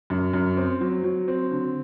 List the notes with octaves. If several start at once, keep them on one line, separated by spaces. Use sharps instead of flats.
F#2
F#2
C4
F#3
F#3
C4
D3